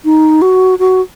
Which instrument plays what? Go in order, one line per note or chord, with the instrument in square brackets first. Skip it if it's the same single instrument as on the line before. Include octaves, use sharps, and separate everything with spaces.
[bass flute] D#4
F#4
F#4